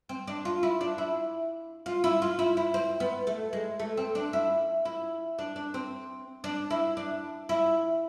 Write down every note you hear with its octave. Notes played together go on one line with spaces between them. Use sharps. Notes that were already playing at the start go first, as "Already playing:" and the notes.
C4
D4
F4
E4
D4
E4
F4
E4
F4
E4
E4
C4
B3
A3
G#3
A3
C4
D4
E4
E4
D4
D4
C4
D4
E4
D4
E4